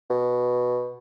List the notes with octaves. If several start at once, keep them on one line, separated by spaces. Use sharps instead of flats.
B2